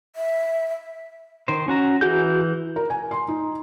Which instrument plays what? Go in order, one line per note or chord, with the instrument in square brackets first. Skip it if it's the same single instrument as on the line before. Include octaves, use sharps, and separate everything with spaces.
[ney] E5
[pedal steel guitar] D#3 C5
C#4 F#4 A#5
[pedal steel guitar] E3 [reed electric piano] F#4 G#4 G6
[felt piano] A#4
G#5
C6
D#4